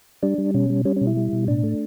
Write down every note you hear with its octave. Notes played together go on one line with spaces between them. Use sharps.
G3 D4
G3
B2 C#4
G3
G3 C#4
C#4
B2
E4
G3
B2
A2 D4
A3